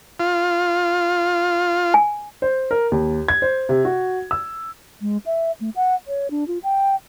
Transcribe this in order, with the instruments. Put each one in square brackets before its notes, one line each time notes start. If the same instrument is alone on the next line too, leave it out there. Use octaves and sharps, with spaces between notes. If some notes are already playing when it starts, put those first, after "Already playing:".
[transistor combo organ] F4
[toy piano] G#5
[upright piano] C5
A#4
D#2
G#6
C5
C3
F#4
E6
[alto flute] G#3
E5
A3
F#5
C#5
D4
F4
G5